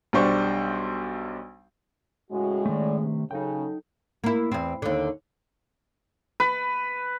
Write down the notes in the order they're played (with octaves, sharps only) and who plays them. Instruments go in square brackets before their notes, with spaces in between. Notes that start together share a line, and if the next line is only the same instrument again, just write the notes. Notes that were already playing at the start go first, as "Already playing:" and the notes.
[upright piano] B1 G3 D4 C5 C#6
[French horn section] A2 C#3 G#3 [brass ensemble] F#4
[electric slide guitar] D#3 A3 [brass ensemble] D5
[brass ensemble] G2 C3
[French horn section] C#3 [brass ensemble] F#3 A4 [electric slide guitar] D#4 G5
[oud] A#3 E4
E2 C4
D#2 D3
[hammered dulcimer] B4